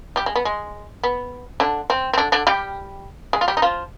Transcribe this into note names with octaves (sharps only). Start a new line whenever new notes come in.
G3 G4
G#3
B3
G#3
B3
D3 D4
C4
C4
D3 D4
D3 D4
G3 G4
G#3 G#4
F4
G3 G4
D#4
F3 F4